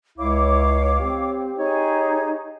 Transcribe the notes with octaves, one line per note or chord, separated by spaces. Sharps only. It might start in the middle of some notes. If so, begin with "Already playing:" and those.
C#2 E4 C#5 F5 D6
C4 G4
D#4 G#4 C#5